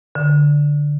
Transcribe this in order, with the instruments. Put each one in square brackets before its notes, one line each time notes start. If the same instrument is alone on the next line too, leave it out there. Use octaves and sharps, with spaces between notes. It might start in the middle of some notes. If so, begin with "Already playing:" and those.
[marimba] D3